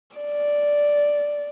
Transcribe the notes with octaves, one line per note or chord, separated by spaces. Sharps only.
D5